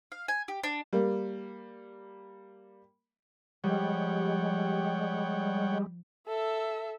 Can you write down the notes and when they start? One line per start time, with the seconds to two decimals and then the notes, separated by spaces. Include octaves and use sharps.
0.12 F5
0.28 G#5
0.48 G4
0.64 D4
0.93 G3 A#3
3.64 F3 G3 G#3 C#5 F#5 G5
6.28 A4 E5